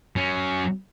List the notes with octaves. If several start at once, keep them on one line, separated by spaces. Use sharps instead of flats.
F#3 C#4